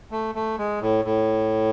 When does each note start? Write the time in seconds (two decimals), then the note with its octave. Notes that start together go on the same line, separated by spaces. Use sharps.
0.11 A3
0.35 A3
0.58 G#3
0.81 A2
1.05 A2